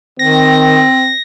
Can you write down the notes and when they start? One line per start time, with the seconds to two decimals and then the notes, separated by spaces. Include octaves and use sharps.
0.19 D#3 C4 A#6